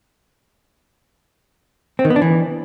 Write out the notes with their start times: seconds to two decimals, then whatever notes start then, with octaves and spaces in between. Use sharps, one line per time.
1.99 C4
2.05 D#3
2.10 B3
2.16 D4
2.22 E3